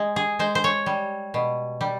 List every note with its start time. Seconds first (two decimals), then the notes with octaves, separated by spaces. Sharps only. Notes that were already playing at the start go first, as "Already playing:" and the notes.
Already playing: G#3
0.16 G#4
0.39 G#3 C5
0.55 C5
0.64 C#5
0.86 G3
1.34 B2
1.81 G3